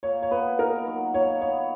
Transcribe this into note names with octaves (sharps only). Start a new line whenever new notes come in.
A#2 C#5
C#5
B3 B4
D#4 A#4
F#3
A#2 C#5
B3 C#5